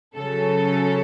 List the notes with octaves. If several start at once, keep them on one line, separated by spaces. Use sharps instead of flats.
C#3 F#3 C#4 A4